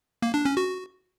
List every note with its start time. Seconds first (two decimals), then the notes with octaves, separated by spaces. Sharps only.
0.22 A#3
0.34 D4
0.45 C#4
0.57 F#4